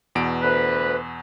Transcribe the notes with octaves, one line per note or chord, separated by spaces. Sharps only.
E2 B2 D7
D2 B4